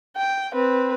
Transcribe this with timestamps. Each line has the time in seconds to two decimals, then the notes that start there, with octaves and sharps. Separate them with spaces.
0.17 G5
0.54 C4 B4